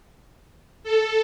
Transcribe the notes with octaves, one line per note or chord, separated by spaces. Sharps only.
A4